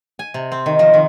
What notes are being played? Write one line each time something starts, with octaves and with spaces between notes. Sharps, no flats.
G#5
C3
C4
D#3
F3
D#3